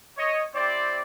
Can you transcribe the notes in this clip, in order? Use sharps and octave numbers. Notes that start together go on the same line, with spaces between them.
C#5 D#5
C4 E4 G4 C5 D5